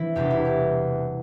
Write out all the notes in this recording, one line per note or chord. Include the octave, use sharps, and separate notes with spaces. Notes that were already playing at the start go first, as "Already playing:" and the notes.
Already playing: E3 C4 E4
E1 E2 C3 G3 G4
E4
G4